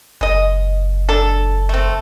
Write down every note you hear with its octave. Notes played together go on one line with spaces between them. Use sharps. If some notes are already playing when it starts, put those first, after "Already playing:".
F#1 G#3 D#5
D4 A4
A3 C4